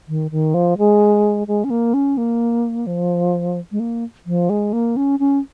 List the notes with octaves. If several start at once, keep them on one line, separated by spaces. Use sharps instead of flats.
D#3
D#3
F3
G#3
G#3
C#4
A#3
C#4
A#3
F3
G#3
A#3
F3
G#3
A#3
C#4
C#4